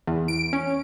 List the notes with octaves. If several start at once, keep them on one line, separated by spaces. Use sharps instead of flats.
E2
D7
C#4